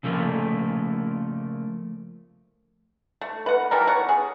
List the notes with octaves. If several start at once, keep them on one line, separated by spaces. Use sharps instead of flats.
C#3 F3 A3 A#3
A3
B4 F#5
E3 G3 A4 A#4
B3 C#5 F#5
G#4